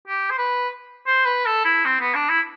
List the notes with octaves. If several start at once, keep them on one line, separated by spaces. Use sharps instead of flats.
G4
C5
B4
C5
B4
A4
E4
C4
B3
D4
E4